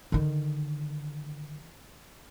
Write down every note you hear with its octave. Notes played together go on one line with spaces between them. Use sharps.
D3 D#3